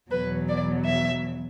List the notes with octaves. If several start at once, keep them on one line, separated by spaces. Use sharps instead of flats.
E2 B2 F#3 B4
D5
E5